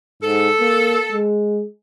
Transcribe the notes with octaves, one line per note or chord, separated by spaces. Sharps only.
G#2 A4
A#3
G#3